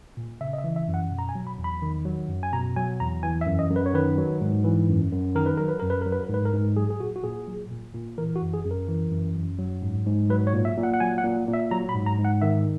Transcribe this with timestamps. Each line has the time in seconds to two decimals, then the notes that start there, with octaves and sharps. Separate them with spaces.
0.17 A#2
0.41 C#3 E5
0.53 D#5
0.58 E5
0.64 E3
0.76 E5
0.88 F#2
0.94 F#5
1.11 B2
1.19 A#5
1.29 G#5
1.35 F#3
1.47 B5
1.58 E2
1.64 B5
1.82 D#3
2.05 F#3
2.28 F#2
2.43 G#5
2.52 B2 A#5
2.76 F#3 G#5
3.00 E2 A#5
3.23 E3 G#5
3.41 E5
3.46 F#2
3.59 D#5
3.70 F#2
3.76 B4
3.86 C#5
3.94 D#3 B4
4.18 F#3
4.41 G#2
4.64 E3
4.89 F#2
5.12 F#2
5.35 D#3 A#4
5.46 B4
5.57 F#3 A#4
5.68 B4
5.79 F#2 A#4
5.90 B4
6.02 F#3 A#4
6.12 B4
6.24 A#4
6.29 G#2 B4
6.45 A#4
6.53 G#2
6.76 F#3 G#4
6.90 G#4
7.00 A#2 F#4
7.16 F#4
7.24 A#2 G#4
7.48 F#3
7.71 A#2
7.94 A#2
8.18 E3 A#4
8.35 F#4
8.42 F#2
8.54 G#4
8.65 F#2
8.71 A#4
8.88 E3
9.12 F#2
9.36 F#2
9.59 F#3
9.82 G#2
10.06 G#2
10.29 F#3 B4
10.47 C#5
10.53 A#2
10.65 E5
10.77 A#2
10.83 F#5
10.94 F#5
11.00 F#3 G#5
11.18 F#5
11.24 A#2
11.48 A#2
11.53 E5
11.71 F#3 A#5
11.89 B5
11.95 G#2
12.06 A#5
12.19 G#2
12.25 F#5
12.42 D#3 E5